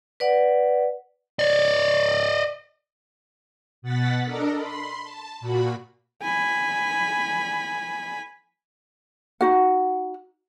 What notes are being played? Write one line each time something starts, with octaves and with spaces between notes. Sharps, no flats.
B4 D5 F#5
D5 D#5
B2 F#5 A6 B6
D4 A4 A#4 D#5
B5 C6
A5
A#2 F#4 B5
G#5 B5
D#4 F#4 F#5